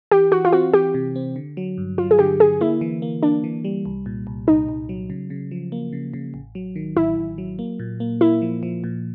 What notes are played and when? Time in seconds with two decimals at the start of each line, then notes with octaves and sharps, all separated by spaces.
0.11 E3 G4
0.32 E3 F#4
0.45 F4
0.53 C4 F#4
0.74 E3 G4
0.94 C3
1.16 C4
1.36 D3
1.57 F#3
1.78 G2
1.98 F#3 F4
2.11 G#4
2.19 D3 G4
2.40 D3 G#4
2.61 A#3 E4
2.81 E3
3.02 A#3
3.23 A#3 D4
3.44 E3
3.64 G3
3.85 C2
4.06 A#2
4.27 C2
4.47 C2 D#4
4.68 C2
4.89 F#3
5.10 C#3
5.30 C#3
5.51 F3
5.72 A#3
5.93 C#3
6.14 C#3
6.34 A1
6.55 F#3
6.76 D#3
6.96 A1 E4
7.17 A1
7.38 F#3
7.59 A#3
7.80 A#2
8.00 A#3
8.21 A#3 E4
8.42 F3
8.63 F3
8.84 A#2